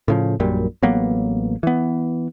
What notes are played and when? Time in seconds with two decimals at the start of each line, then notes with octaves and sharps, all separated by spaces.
0.08 A2 C#3 F3
0.40 A#1 F#2 A#2 G3
0.83 A1 F#3 A#3 B3
1.63 E3 B3